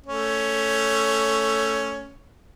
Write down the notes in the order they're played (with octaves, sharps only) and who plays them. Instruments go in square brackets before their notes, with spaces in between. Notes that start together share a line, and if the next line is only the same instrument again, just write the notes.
[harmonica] A3 C#4